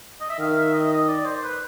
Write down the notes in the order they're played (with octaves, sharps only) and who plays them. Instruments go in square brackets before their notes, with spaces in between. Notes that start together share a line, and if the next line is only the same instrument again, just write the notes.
[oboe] D#5
E5
[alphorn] D#3 [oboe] F5
[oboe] E5
D#5
D#5
D5
C5
B4